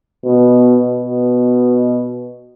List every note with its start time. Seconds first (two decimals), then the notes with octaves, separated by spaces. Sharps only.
0.25 B2
1.00 B2